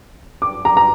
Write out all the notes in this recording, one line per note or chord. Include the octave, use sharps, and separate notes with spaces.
D6
A#5
A#5